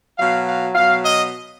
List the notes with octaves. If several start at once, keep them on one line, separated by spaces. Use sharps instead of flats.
B2 F#3 F5
F5
B2 F#3 F5
D#5